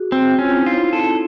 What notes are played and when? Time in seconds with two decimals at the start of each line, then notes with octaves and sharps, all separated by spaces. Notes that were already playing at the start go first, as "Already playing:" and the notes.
Already playing: F#4 G#4
0.12 C4
0.39 C#4 F4
0.48 E4
0.57 D#4
0.66 E4 F4
0.80 C4
0.93 A4